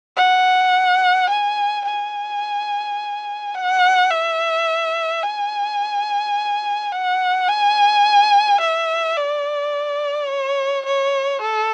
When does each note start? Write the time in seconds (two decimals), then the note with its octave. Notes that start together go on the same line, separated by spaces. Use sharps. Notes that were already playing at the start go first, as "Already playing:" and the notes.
0.17 F#5
1.29 G#5
1.86 G#5
3.55 F#5
4.10 E5
5.23 G#5
6.92 F#5
7.48 G#5
8.61 E5
9.17 D5
10.29 C#5
10.85 C#5
11.41 A4